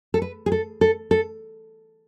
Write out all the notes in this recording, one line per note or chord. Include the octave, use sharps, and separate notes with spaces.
A4
B4
G#4
A4
A4
A4